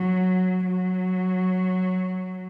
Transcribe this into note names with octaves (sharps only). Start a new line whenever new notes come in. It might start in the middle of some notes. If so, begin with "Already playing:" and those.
Already playing: F#3
F#3